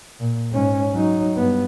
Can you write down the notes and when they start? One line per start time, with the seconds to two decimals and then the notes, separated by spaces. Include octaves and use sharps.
0.20 A#2
0.51 G#2 C#4
0.94 F#3 D#4
1.36 G2 B3